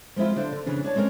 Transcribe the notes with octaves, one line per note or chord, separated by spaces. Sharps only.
F3 G#3 C4 E4 F4
D3 D4 C5 F5
D3
F2 C#3 E3 D4
D4 C#5 A5
G#3 C4 C#4 A#4